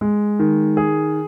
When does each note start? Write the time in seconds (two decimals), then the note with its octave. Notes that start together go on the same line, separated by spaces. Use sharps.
0.01 G#3
0.39 D#3
0.77 G#4